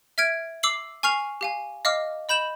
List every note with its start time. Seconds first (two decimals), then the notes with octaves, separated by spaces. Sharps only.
0.18 E5 F6 G#6 D7
0.63 D6 E6 C7 F#7
1.03 G#5 C#6 F6 C7 F7
1.41 G4 F5 G#5
1.85 D#5 F5 D6 F6
2.29 D#5 B5 G6 E7 F#7